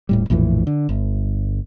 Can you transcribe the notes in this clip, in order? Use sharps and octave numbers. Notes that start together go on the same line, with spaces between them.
D#1 A2 G3
A#1 F2 A2 E3
D3
G1